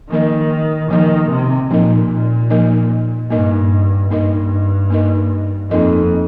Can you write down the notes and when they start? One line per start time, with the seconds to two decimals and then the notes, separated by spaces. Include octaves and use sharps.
0.10 D#3 F3 A#3 D#4 A#4 D#5
0.90 D#3 F3 A#3 D#4 A#4 D#5
1.31 C3
1.70 A#2 F3 A#3 D#4 A#4 D#5
2.50 F3 A#3 D#4 A#4 D#5
3.30 G2 A#3 D#4 A#4 D#5
4.10 G2 A#3 D#4 A#4 D#5
4.90 A#3 D#4 A#4 D#5
5.71 F2 A#3 D#4 A#4 D#5